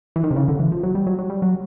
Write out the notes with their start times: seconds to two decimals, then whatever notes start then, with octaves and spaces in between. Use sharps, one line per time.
0.16 E3
0.24 D#3
0.31 C3
0.36 C#3
0.48 D3
0.59 E3
0.72 F3
0.83 F#3
0.95 G3
1.07 F#3
1.19 F#3
1.30 G3
1.42 F#3